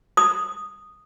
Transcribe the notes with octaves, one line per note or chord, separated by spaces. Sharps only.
D#6